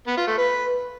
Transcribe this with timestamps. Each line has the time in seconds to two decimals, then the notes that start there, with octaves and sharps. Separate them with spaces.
0.07 B3
0.17 F4
0.27 A3
0.37 B4